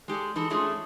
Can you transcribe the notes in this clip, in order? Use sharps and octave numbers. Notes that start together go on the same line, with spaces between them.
G#3 G4 A4 D5
E3 G#3 D#4 A4
G#3 A3 C#4 D4 F4 G#4